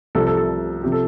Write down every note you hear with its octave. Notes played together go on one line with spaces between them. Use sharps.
C2 C3 F3 A4
A4
A4
C3 F3 G4
A4